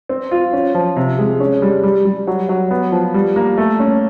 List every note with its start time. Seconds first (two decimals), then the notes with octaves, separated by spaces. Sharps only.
0.09 C4
0.31 F4
0.53 C#4
0.75 F3
0.97 C3
1.19 G#3
1.40 C#4
1.62 G3
1.83 G3
2.05 G3
2.27 F#3
2.49 F#3
2.71 B3
2.92 F3
3.14 G3
3.36 A#3
3.58 A3
3.80 C#4